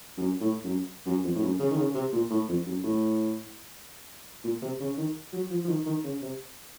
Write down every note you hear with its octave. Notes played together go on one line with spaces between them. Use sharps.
F#2
A2
F#2
F#2
F2
A2
F#2
C#3
D#3
C#3
C3
A#2
A2
F2
F#2
A2
A#2
C3
C#3
D#3
F#3
F3
F3
D#3
D#3
C#3
C3